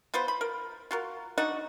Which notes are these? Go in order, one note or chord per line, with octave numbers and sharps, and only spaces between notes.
B3 F4 B4 C5
B5
A#4
F4 F#4 A#4
D4 D#4 F#4 F#5